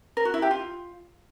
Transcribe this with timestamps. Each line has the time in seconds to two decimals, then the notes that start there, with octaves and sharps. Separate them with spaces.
0.17 A#4
0.25 F#4
0.34 E4
0.42 G4
0.51 F4